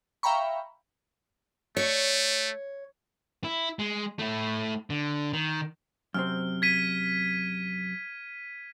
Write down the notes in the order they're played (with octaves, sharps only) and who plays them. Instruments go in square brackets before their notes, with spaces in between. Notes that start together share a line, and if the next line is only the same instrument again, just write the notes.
[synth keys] E5 F5 G5 A#5 B5 C#6
[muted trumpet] A3 [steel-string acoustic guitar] C#5
[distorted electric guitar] E4
G#3
A3 E4
D3
D#3
[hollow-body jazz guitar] F#2 C3 C4 [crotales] F6
[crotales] G#6 B6 D#7